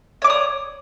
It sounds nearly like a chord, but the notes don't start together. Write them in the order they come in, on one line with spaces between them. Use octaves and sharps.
C#5 D6 D5 D#6